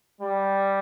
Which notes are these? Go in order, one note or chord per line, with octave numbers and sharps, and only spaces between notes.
G3